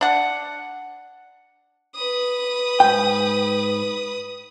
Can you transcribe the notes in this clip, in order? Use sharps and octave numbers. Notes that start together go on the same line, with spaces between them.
D4 F#5
B4 D#6
G#2 G5